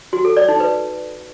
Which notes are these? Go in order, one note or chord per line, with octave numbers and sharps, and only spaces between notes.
F#4
A4
D5
D#4
B4